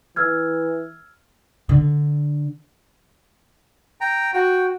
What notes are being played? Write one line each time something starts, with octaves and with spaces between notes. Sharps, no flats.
E3 E6 F6 G#6
D3
G5 A#5
F#4 G5